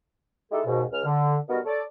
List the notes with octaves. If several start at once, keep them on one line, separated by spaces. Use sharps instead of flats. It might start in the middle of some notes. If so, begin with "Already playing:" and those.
G#3 D#4 E4 G4 A4
D#2 G#2 B2
C#2 F6
D3
B2 G3 B3 D#4 F#4 A#4
A4 C#5 D5